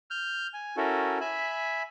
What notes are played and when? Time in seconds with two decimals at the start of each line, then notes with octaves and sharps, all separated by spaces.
0.11 F6 G6
0.53 G#5
0.77 C#4 E4 F#4 A4 A#4
1.21 E5 G#5 B5